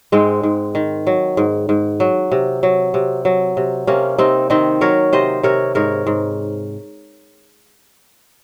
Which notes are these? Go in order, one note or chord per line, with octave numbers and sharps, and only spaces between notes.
G#2 G#3 C4
G#2
D#3
F#3
G#2
G#2
F#3
C3
F#3
C3
F#3
C3
C3 A#3 C#4
C3 C4 D#4
D#3 C4 D#4
F#3 A#4 C#5
C3 C5 D#5
C3 A#4 C#5
G#2 A#4 C#5
G#2